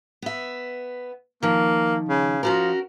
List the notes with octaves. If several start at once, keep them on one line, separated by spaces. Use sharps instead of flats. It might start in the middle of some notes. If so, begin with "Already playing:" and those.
B3 E5
D#3 F3 A#3
C#3
F3 C#4 F#4 A#4